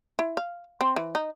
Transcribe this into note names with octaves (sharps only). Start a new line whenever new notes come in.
E4
F5
C4
E3
D#4